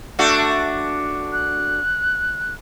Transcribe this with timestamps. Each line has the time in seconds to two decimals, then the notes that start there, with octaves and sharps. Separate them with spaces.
0.19 A3 D4 F#4
1.32 F#6